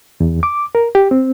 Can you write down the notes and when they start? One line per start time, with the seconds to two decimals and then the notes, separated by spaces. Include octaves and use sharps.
0.20 E2
0.43 D6
0.75 A#4
0.95 G4
1.11 C4